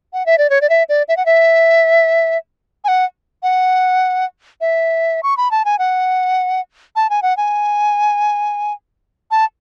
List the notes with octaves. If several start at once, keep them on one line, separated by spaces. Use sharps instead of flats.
F#5
E5
D5
C#5
D5
E5
D5
E5
F#5
E5
G#5
F#5
F#5
E5
C#6
B5
A5
G#5
F#5
A5
G#5
F#5
G#5
A5